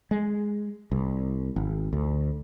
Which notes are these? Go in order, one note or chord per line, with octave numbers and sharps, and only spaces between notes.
G#3
C2
G#1
D2